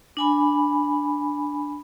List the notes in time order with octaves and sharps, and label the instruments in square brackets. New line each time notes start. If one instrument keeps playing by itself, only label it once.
[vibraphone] D4 G#5 B5